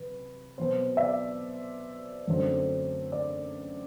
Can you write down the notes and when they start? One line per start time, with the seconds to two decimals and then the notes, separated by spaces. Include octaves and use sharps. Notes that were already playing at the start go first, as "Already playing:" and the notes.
Already playing: C3 F#3 B4
0.58 B2 F#3 C4 C5
0.97 E5
1.01 D5
2.28 F#2 D3 F#3 A3 C4
3.12 D5